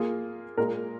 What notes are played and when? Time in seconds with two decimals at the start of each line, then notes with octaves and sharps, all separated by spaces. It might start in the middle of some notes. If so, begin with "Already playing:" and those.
Already playing: A#3 F4 G#4
0.58 A#2 G#3 F4 A#4